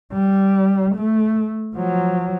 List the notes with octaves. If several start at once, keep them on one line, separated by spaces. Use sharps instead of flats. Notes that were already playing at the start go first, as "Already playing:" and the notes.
G3
A3
F3 F#3